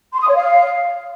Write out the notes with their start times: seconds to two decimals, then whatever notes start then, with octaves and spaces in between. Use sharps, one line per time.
0.13 C6
0.21 D#6
0.28 C#5
0.36 F5